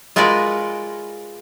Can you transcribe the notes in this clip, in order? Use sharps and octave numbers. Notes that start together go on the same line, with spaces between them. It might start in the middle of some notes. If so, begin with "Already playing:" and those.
G#3 F4 F#4 A#4 B4 D5